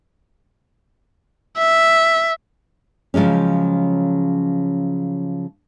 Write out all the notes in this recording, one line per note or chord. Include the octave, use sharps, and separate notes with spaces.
E5
C#3 F3 F#3 G#3 C#4